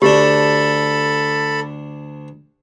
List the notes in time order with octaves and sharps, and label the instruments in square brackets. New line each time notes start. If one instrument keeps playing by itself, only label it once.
[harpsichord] D2 D4 [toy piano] G4 [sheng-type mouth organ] A4 B5